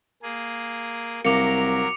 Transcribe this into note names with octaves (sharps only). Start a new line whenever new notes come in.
A#3 G#4
C2 F#3 A#3 A#4 D6 C#7